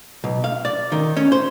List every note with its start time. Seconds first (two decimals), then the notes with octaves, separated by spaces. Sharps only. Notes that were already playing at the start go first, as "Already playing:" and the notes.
0.24 B1
0.44 F5
0.65 D5
0.92 D#3
1.17 C#4
1.32 C5